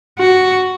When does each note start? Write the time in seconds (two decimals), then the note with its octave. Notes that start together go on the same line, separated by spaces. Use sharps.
0.19 F#4